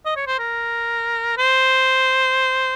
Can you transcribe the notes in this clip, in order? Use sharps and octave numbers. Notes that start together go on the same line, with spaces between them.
D#5
C#5
C5
A#4
C5